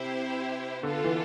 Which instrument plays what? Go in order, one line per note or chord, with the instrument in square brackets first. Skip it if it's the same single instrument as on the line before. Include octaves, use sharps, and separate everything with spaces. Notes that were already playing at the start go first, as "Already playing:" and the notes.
Already playing: [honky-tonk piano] C3 [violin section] E4 G4 C5
[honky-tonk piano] D3 [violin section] B3 F4 A4
[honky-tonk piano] E3